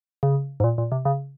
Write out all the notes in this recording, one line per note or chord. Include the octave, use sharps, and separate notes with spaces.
C#3
G#2
A#2
A#2
C3
C#3